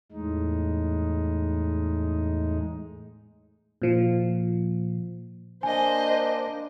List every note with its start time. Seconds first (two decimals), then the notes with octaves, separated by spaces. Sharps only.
0.12 E2 A2 G#3 D#4
3.82 A#2 F3
5.63 A#3 D4 C5 D#5 G#5